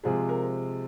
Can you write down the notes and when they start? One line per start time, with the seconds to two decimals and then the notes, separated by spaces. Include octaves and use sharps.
0.04 C3 F3 G#3 G#4
0.29 A#4